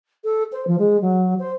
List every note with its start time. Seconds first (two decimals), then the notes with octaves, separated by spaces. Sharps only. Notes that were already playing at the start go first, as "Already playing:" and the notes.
0.24 A4
0.52 C5
0.67 F3
0.78 G#3
1.01 F#3
1.39 C5